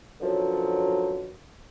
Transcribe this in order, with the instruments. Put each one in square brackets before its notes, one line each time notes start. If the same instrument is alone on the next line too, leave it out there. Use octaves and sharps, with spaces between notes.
[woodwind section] F#2 B2 D3 F3 F#3